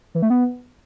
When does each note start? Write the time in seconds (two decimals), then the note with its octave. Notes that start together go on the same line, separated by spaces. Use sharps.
0.15 E3
0.22 A3
0.30 B3